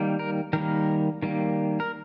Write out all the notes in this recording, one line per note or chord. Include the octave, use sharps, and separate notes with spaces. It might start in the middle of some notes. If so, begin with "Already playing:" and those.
Already playing: D#3 G3 A#3
A#4
D#3 G3 A#3 A#4
D#3 G3 A#3
A#4